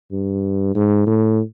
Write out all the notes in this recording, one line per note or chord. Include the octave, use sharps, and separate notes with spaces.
G2
G#2
A2